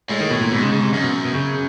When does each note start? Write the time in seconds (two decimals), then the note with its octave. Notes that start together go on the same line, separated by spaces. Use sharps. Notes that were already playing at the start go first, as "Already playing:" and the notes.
0.09 A2 G#3
0.20 D#3
0.31 B2
0.41 A#2
0.52 G#2 B2
0.62 C#3
0.73 C#3
0.82 C3
0.93 F#2
1.03 B2
1.25 B2
1.35 C#3